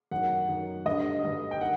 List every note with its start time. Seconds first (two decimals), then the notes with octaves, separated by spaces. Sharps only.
0.11 F#2 D#3 F#5
0.48 F#2 D#3
0.86 G2 D3 D#5
1.23 G2 D3
1.51 G5
1.61 D#3 F#5